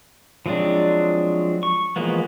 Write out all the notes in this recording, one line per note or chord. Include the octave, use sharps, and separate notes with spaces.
F3 F#3 G#3 C4 D4
C#6
E3 F3 G#3 A#3 B3